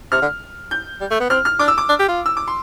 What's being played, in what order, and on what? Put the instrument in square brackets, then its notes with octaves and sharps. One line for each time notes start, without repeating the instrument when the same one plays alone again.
[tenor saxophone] C3 [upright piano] F6
[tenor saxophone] D3
[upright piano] G6
[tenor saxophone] G3
A3
B3
[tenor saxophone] C4 [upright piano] F6
[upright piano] F6
[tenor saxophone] D4 [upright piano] D6
[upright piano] E6
D6
[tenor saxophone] D4
G4
F4
[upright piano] E6
D6
C6